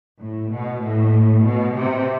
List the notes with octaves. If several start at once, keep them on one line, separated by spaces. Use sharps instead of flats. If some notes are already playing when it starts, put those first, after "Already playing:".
A2
B2
A2
B2
C3